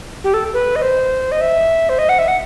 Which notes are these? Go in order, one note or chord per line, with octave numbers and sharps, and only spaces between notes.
G4
A4
B4
D#5
C5
D#5
E5
C5
D#5
F#5
E5
F#5